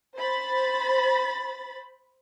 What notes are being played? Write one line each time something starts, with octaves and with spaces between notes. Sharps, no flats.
C5 B5 A6